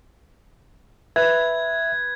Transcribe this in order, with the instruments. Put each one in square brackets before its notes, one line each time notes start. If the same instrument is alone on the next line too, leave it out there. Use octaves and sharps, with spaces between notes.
[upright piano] B4 [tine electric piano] E5 [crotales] G#6